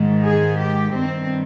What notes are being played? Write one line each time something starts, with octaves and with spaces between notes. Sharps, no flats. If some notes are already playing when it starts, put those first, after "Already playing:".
Already playing: G#2 D#3
G#4
G4
G2 D#3 C4